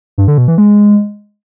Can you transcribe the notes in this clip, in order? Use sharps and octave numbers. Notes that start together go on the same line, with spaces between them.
G2
D3
B2
E3
G#3